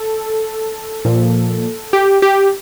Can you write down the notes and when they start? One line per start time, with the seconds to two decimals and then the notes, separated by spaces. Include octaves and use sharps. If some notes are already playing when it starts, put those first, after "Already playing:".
Already playing: A4
1.05 A#2 F3
1.93 G4
2.22 G4